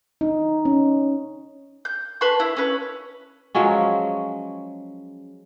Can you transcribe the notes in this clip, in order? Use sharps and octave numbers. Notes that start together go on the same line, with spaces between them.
D#4
C#4
G6
B4 A5 C6 C#6
E4
C#4 B4
F3 F#3 G#3 C#4